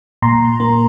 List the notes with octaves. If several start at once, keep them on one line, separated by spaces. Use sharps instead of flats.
A#2 A#5 C6
A#3